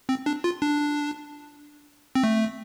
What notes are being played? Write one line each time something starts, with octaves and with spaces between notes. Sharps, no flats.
C4
D4
F4
D4
C4
A3